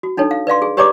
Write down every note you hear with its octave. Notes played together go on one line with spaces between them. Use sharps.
F#4
D4 D#4 A4 C#5
F5
B4 D5 F5 C6
G#4
G4 B4 C#5 D5 A#5 D6